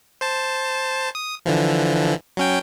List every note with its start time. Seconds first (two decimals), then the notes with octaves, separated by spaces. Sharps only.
0.21 C5 A5
1.15 D#6
1.46 D3 E3 F3
2.37 F#3 C#4 G5